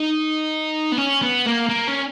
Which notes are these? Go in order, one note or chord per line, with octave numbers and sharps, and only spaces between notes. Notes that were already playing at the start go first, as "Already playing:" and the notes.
Already playing: D#4
B3
C#4
B3
A#3
A#3
C#4